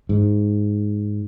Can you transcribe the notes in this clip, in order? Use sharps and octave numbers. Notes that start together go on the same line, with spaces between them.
G#2